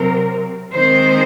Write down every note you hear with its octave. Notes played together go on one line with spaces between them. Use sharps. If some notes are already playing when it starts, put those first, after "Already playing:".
Already playing: C3 F#3 C4 A#4
D#3 G#3 C4 C5